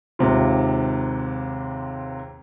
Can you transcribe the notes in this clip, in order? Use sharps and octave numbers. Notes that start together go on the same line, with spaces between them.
D#2 G#2 C3 F4